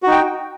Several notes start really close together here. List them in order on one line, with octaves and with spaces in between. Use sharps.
F#4 D#4 G5